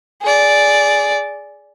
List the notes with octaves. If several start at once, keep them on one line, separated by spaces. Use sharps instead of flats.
G#4 D5